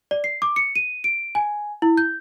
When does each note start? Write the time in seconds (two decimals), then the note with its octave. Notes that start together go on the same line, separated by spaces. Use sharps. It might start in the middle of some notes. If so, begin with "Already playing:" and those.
0.11 D5
0.24 C7
0.42 D6
0.56 C#7
0.75 D#7
1.04 D7
1.35 G#5
1.82 E4
1.97 G6